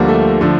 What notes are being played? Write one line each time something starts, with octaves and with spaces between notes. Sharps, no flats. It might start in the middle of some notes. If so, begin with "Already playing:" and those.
Already playing: D2 D3 F3 G3 A#3
A3
D3 F3